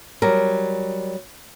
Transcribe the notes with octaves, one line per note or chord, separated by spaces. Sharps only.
F#3 G3 A#4